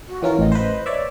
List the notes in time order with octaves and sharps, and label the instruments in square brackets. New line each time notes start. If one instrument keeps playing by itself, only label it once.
[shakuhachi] F#4
[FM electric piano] E3 C#4 A#4 [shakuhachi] F4
[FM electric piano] A1 [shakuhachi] D#5
[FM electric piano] B4 C5
C#5 D5 E5